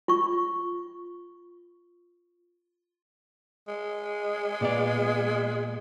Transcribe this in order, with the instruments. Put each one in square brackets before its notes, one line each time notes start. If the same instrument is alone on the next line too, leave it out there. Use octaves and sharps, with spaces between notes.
[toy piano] F4 C#6
[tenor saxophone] G#3
[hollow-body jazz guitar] A#2 B3 D5